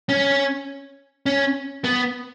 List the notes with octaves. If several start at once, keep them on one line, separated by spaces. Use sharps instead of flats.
C#4
C#4
B3